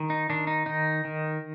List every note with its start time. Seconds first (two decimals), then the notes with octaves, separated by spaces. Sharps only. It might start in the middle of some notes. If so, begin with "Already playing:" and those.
Already playing: D#3
0.10 D#4
0.30 D#3 D4
0.47 D#4
0.66 D#3 D#4
1.05 D#3